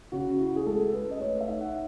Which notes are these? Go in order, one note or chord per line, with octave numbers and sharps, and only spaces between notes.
C#3 F#4
E4
G#4
G#3 A4
C#4 B4
D#5
A3 C#5
E5
D#4
F#5